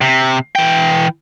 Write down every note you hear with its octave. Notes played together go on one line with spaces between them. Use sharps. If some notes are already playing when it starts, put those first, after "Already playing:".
C3
E3 G5